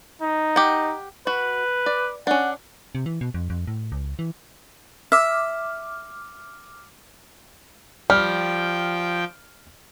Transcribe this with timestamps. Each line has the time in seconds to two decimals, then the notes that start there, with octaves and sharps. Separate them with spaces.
0.21 D#4
0.56 G4 F#5
1.27 F#4 B4
1.86 D5
2.27 C#4 D4 F#5
2.95 C3
3.06 E3
3.21 B2
3.34 F2
3.50 F2
3.67 A2
3.92 C#2
4.19 E3
5.12 E5 D6 F6
8.10 F3 G3 G5 F6